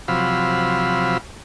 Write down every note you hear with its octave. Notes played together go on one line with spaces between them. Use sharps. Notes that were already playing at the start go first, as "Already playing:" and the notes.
C3 F3 F#3 F5 B5 E6